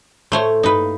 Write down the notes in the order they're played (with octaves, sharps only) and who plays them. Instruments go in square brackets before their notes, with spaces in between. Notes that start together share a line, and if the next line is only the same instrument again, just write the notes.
[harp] A2 [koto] A3 C5 C#5
[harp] G2 [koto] D#4 B4
[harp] A#3